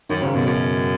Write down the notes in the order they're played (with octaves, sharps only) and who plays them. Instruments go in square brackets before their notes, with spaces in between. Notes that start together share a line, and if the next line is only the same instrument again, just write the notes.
[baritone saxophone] F#2 [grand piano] D#3
[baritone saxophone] G#2 [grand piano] C#3
[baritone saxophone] F#2 [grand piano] B2
[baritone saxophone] F#2